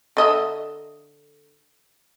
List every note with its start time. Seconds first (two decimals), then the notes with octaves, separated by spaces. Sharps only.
0.17 D3 D#5 E5